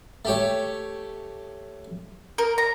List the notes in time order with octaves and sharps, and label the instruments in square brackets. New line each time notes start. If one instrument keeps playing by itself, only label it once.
[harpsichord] A3 G4 C#5
[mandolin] A#4
A#5